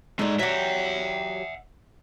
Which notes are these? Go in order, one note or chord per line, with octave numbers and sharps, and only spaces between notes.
G#3 A3 D4 D#4
F#3 G4 E5 F#5